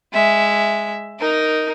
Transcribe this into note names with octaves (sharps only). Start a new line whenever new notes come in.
G#3 E5
D#4 A#4